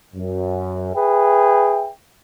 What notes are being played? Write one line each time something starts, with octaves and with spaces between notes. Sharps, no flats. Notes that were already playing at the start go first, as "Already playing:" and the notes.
F#2
G#4 B4 E5 G5